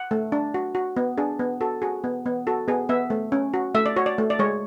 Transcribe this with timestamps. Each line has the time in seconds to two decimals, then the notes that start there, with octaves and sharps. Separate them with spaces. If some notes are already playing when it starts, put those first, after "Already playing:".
Already playing: F#5
0.11 A3
0.32 D4
0.54 F#4
0.75 F#4
0.97 B3
1.18 D4 G#4
1.39 B3
1.61 F#4 A4
1.82 F#4 G#4
2.04 B3
2.26 B3
2.47 F#4 A4
2.68 B3 G#4
2.89 B3 E5
3.10 A3
3.32 C#4
3.54 F#4
3.75 A3 E5
3.86 D5
3.96 F#4 C#5
4.06 D5
4.18 A3
4.30 D5
4.39 G#3 C#5